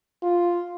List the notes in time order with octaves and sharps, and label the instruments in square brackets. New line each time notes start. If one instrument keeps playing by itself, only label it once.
[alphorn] F4